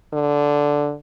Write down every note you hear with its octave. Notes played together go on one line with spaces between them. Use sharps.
D3